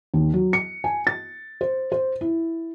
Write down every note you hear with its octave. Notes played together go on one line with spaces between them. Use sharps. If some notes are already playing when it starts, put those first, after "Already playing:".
D#2
F#3
C#7
G#5
A6
C5
C5
E4